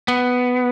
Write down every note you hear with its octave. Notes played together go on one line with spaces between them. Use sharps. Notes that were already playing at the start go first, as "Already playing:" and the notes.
B3